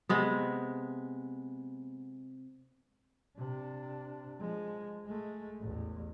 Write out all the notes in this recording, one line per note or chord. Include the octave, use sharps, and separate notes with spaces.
C3 G#3 B3
C3 D4
F3 G#3
G#3 A3
A1 E2